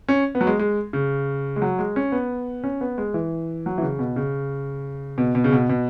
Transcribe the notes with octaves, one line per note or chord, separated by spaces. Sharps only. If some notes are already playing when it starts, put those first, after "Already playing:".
C#4
B3
F#3
G#3
G#3
C#3
G#3
F#3
G#3
C#4
B3
C#4
B3
G#3
E3
F#3
E3
C#3
B2
C#3
B2
B2
C#3
B2
B2